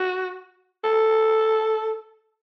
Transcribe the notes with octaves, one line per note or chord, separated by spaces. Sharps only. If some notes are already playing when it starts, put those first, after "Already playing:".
Already playing: F#4
A4